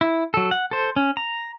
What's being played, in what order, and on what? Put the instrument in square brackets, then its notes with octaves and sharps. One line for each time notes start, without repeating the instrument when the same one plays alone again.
[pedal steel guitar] E4
F#3 A4
F#5
A4 C5
C#4
A#5